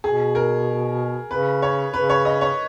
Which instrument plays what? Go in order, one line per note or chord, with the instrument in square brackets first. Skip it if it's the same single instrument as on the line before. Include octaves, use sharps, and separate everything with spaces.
[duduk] B2 [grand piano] G#4
[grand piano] A#4
[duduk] C#3 [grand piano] B4
[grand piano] C#5
[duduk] C#3 [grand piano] B4
[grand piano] C#5
D#5
C#5